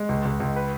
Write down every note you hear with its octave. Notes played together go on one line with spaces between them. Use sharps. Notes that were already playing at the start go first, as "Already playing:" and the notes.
Already playing: G#3
C#2
C#2
C#2
B4